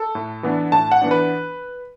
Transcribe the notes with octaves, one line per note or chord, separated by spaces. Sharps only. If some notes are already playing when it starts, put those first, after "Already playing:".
Already playing: A4
A2
E3 B3 D4
A2 A5
F#5
E3 B3 D4
B4